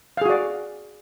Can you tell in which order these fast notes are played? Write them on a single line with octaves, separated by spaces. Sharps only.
F5 G#4 F#4 D5